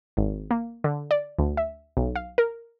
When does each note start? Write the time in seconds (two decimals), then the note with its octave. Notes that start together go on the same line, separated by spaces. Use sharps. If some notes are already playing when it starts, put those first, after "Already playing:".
0.17 G#1
0.51 A#3
0.84 D3
1.11 D5
1.39 D2
1.57 E5
1.97 B1
2.16 F5
2.38 A#4